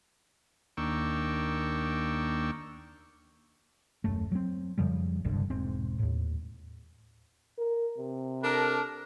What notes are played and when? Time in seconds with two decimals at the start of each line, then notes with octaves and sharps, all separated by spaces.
0.77 D#2 A#3 D4 G5 C#6 E6
4.04 D#1 F#2 A3
4.32 F#3 C4
4.78 F2 C#3 F3 G3
5.25 F#1 C2 G2 D3
5.50 E1 G#2 C4
5.99 D#2 A2
7.58 A#4
7.98 C3
8.43 D4 A4 A#4